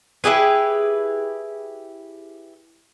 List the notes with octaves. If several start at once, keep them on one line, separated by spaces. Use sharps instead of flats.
E4 G4 G#4 B4